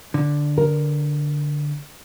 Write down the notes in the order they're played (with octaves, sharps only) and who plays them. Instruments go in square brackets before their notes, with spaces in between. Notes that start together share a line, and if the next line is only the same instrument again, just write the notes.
[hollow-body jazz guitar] D3
[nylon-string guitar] A#4